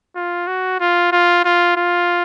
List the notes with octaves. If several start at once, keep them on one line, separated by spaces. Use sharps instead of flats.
F4
F#4
F4
F4
F4
F4